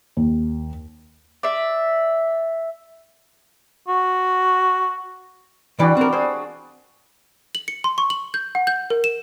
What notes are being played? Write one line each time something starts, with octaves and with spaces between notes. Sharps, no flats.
D#2
D5 E5
F#4
E3 G3 D4 F#4 D5
C4 A#4
D4 G#4 C5
F#7
C#7
C6
C#6
F#7
G6
F#5
G6
A#4
E7